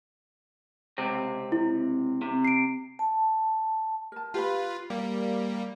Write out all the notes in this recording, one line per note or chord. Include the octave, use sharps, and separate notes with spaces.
C#2 C3 C4
E4
C3
C7 D7
A5
A#4 A5
F4 G4 B4 B5
G3 A#3
D5